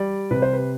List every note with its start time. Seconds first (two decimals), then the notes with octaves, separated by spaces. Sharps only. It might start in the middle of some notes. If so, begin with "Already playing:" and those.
Already playing: G3 D5
0.31 C3 B4
0.42 C5
0.53 B4